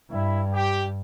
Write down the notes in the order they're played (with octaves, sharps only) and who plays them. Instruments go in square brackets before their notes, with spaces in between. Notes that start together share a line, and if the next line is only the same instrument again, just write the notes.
[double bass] G2 [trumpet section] E4
[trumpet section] G4